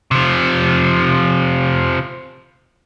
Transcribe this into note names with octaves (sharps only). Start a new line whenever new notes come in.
C3 F3